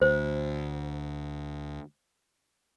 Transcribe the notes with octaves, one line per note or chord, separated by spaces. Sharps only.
D2 C5